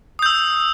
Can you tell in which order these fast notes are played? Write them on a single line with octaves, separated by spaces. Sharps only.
D#6 G6 E6